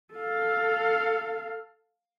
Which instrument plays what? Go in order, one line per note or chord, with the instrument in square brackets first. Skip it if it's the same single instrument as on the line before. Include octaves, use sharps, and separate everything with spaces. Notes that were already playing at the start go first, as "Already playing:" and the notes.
[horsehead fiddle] A4 F5